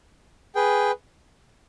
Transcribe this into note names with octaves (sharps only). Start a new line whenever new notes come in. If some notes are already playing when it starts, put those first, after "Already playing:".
G#4 B4 G5